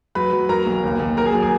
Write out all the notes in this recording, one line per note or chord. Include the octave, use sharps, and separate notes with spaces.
F#3 B4 B5
F#3
F#3 A#4 A#5
B1
D#2
D#2
F#3 A#4 A#5
G#4 G#5
F#3
G#4 G#5